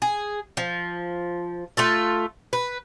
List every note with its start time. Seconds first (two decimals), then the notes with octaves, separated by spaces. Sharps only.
0.02 G#4
0.57 F3
1.77 A3 F4 A4
2.53 B4